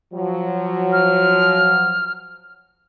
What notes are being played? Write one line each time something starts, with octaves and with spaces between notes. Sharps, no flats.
F3 F#3
F6